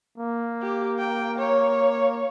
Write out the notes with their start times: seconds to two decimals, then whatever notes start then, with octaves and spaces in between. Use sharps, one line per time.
0.18 A#3
0.62 G4
0.99 G5
1.39 C#5